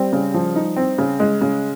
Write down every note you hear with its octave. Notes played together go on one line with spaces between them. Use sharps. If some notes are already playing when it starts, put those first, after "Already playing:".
Already playing: G3 C4
C#3
F3
D#4
C4
C#3
G#3
C#3